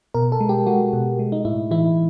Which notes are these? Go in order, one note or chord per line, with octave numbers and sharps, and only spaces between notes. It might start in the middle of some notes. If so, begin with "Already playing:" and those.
B2 A#4
A4
G#3
G4
G#3 F#4
B2
G#3
D#4
A2 E4
E3 E4